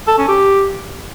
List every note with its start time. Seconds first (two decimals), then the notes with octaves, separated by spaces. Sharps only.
0.08 A4
0.18 C#4
0.28 G4